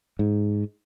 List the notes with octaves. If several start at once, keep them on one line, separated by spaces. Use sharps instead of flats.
G#2